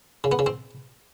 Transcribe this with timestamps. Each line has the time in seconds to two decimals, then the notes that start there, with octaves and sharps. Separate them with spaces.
0.24 C#3
0.32 B3
0.39 C#3
0.46 C4